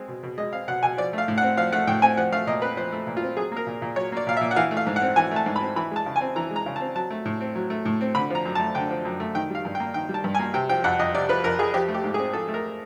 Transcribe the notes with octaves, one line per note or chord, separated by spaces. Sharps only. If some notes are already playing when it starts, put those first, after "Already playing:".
Already playing: G#3 C4
B2
B2
G#3 D#5
C4 F5
B2 F#5
B2 G#5
F3 D5
A3 F5
A2
F#5
C4
F3 F5
A3 F#5
A2 G5
C4 G#5
F3 F#5
A3 F5
A#2 D#5
C4 B4
F3 C5
A3
A#2
F4
C4
F#3 G#4
A#3 A#4
A#2
A#2
F#3 C#5
A#3 D5
A#2 F5
E5
A#2
F#5
E3 F5
A3
F5
G#2
F#5
C4
E3 G#5
A3 A5
G#2
B5
C4
E3 B5
G#3 A5
C#3
G#5
C4
E3 A#5
G#3
A#5
C#3
A5
C4
F#3 A5
A3
A2
C4
F#3
A3
A2
C4
D3 B5
F3 A#5
F#2
A5
A3
D3 G5
F3
F#2
A3
D#3 G5
G3 F5
G2
G5
A#3
D#3 G5
G3
A5
G2
G#5
A#3
C3 G5
F3 G5
F2 F#5
F2 D#5
C3 D5
F3 B4
F2 A#4
F2 G#4
F3 G4
A3
G4
G#2
G#4
C4
F3 A4
A3
A#4